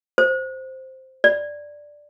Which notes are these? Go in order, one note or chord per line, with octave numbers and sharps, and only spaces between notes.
C5
D5